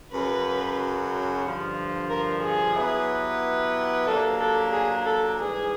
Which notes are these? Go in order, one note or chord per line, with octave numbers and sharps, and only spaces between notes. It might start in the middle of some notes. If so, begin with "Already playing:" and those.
F#2 C#3 F#3 B4
G2 D3 F3
A#4
G#4
F#3 B3 E4 G4 B4
F#3 A#3 D4 G4 A4 A#4
A4
G#4
A4
G#2 E3 G3 G#4